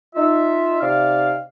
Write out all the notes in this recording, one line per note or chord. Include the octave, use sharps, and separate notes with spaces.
D#4 F4 E5
C3 D#4 D5 F5